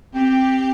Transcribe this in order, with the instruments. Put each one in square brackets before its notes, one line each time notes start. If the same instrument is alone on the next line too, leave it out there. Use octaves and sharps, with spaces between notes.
[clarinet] C4 [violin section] G4